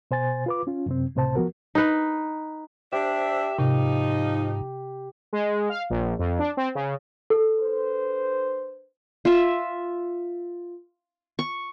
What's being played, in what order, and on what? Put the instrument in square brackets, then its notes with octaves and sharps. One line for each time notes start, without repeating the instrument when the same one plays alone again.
[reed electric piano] B2 C5 G#5 A6
F4 B4 D6
C#4 F4
F#2 C3 C4
C#2 A2 C3 C5 A5
F3 B3 F#4 A#4
[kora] D#4 B4
[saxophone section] D4 E5 [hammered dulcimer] G4 [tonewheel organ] C5
[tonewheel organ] G#2 [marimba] C3 [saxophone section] F3 D#4
[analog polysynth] G#3
F5
A#1
F2
D4
C4
C#3
[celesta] A4
[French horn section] D4 B4 C5
[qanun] F4 E5
C#6